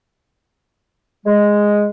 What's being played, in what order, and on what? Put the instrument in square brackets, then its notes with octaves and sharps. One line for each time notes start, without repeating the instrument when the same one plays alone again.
[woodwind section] G#3